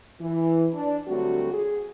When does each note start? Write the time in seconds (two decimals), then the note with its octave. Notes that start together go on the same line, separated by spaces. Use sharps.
0.21 E3
0.73 D4
1.08 D3 F#3 G3 A3 C4 F#4
1.53 F#4 G#4